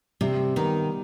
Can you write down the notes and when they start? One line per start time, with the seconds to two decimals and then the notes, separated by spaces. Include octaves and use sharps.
0.21 C3 G3 C4
0.56 D#3 B3 D#4